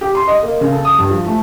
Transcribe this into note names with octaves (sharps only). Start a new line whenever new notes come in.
G4
C6
D#5
A#3
C#3
A4
D#6
G2
F3
A3